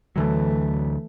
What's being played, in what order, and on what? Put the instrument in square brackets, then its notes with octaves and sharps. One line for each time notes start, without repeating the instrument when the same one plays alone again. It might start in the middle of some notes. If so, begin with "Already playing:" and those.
[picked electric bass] D2 D3 F#3 [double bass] E3 A3